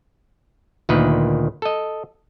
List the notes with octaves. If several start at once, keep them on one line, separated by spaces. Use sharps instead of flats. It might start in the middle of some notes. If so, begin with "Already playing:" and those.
D2 A#2 D#3 B4
A4 D#5